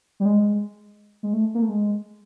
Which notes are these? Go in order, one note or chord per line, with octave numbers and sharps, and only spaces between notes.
G3
G#3
G#3
A3
A#3
A3
G#3